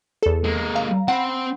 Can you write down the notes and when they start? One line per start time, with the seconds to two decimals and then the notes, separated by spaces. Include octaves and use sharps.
0.23 E2 A4
0.44 G#3 A#3
0.75 F5 A#5
1.08 C4 F#5 B5